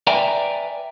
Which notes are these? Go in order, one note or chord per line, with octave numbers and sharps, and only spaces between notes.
B4 D5 E5 G5 G#5 A#5